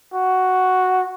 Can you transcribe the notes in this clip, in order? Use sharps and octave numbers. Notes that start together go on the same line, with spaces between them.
F#4